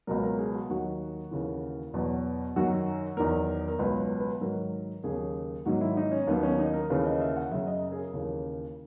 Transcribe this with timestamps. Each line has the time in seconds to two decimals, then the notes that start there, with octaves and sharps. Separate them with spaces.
0.07 C#2 B2 F#3 A#4
0.23 A#4
0.39 G#4
0.54 F#4
0.70 D#2 D#3 F#3 F#4
1.31 D#2 C#3 E3
1.93 E2 B2 F#3
2.56 F#2 D#3 F#3 F#4
3.17 E2 D#3 F#3 A#4
3.68 A#4
3.79 C#2 B2 F#3 B4
4.00 B4
4.20 B4
4.41 G#2 D#3 F#3 A#4
5.04 D#2 C#3 F#3 G#4
5.66 G#2 D#3 F#3 F#4
5.81 E4
5.97 D#4
6.12 C#4
6.27 D#2 D#3 F#3 B3
6.43 C#4
6.59 D#4
6.74 A#4
6.90 D#2 C#3 E3 B4
7.06 D#5
7.21 E5
7.36 F#5
7.52 F#2 C#3 F#3 E5
7.67 D#5
7.92 G#4
7.98 A#4
8.13 D#2 C#3 E3